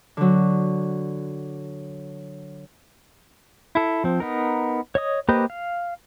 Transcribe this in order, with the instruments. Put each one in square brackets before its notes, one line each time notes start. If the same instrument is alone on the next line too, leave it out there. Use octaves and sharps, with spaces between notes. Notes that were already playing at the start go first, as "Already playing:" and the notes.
[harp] D3 F#3
[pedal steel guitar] E4 A4
F3 C4
B3 D#4 A#4
C#5 D#5 D#6
A#3 G4 B4 C5 D#5
F5